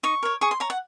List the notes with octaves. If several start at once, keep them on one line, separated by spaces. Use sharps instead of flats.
D#4 C#6
A#4 C#5
G#4 C#6
C6
C#5 A#5
F#5